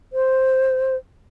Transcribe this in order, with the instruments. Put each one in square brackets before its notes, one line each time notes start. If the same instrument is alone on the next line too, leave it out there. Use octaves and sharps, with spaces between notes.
[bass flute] C5